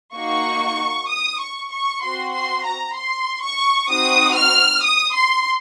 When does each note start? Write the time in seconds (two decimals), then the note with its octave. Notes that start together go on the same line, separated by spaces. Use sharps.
0.15 A#3 D#4 F#4 C#6
1.09 D#6
1.40 C#6
1.71 C#6
2.03 C4 F#4 C6
2.34 C6
2.65 A#5
2.96 C6
3.43 C#6
3.90 C4 D#4 F#4 D#6
4.36 F6
4.84 D#6
5.14 C6